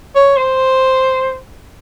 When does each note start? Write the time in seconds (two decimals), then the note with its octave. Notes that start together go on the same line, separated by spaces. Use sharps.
0.15 C#5
0.37 C5